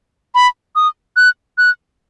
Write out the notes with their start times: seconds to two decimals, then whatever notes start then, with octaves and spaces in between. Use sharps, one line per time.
0.35 B5
0.76 D#6
1.16 F#6
1.58 F#6